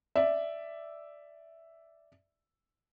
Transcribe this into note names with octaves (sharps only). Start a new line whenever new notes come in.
D5 E5